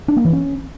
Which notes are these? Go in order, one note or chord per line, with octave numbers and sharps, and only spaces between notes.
D4
A#3
E3
C#4